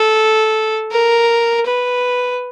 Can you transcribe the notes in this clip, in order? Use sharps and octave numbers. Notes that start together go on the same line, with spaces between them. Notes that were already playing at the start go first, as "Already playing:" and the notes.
Already playing: A4
A#4
B4